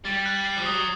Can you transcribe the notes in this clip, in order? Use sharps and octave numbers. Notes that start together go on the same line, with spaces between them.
G3 A6
F#6
C7
F3
F#3 D#6